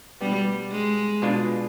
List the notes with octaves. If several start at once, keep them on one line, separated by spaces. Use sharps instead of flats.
B2 G3 B3 D4 G4
G#3
B2 G#3 D4 F4